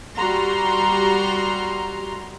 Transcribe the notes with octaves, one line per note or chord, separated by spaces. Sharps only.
G3 F#4 A#5 C6